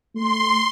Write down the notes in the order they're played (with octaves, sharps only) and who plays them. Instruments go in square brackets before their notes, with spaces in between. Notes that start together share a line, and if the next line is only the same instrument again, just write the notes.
[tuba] A3 [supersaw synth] C6